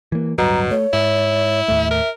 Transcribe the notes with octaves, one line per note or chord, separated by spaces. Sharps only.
E3 A#3
D1 G2 B2 F#3 A#5
A3 C#5
G#2 E4
D#2 A2 A3 E5
A#4